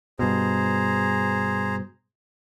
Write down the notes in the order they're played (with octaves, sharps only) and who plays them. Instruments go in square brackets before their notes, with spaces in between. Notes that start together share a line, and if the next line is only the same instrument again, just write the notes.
[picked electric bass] G2 B2 [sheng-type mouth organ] G#4 C5 A#5